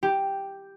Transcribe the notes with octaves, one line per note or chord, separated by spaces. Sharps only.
G4